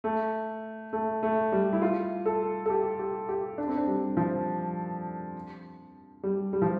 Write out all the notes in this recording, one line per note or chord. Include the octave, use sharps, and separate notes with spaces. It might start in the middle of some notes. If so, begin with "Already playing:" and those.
A3
A3
A3
G3
E4
F4
A4
A4
G4
G4
G4
D4
C4
D4
G3
F3
G3
G3
F3